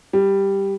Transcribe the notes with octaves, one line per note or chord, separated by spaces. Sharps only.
G3